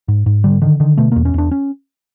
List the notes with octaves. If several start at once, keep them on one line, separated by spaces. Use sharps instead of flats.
G#2
G#2
D3 G3
D3 D#3
D3 D#3
B2 A3
E2 A#3
C#4
E2 D4
C#4